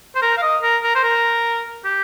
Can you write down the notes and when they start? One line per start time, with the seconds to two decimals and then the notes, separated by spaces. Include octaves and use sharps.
0.16 C5
0.22 A#4
0.37 F5
0.42 D#5
0.63 A#4
0.83 A#4
0.95 C5
1.04 A#4
1.85 G4